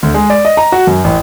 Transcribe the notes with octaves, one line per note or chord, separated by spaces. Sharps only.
D2
G#3
D5
D#5
A#5
F#4
F#2
A1